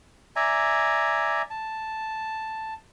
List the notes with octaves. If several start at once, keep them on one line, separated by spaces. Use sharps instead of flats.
D5 E5 G#5 A#5
A5